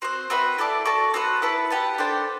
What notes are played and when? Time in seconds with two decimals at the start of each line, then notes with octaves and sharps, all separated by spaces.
0.02 C4 F#4 C5
0.30 C4 F#4 B4 E5
0.58 E4 A4 D5 A5
0.86 F#4 A4 D5 A5
1.14 C4 F#4 B4 F#5
1.42 E4 B4 F#5 A5
1.70 G4 B4 F#5 A5
1.98 D4 A4 C5 G5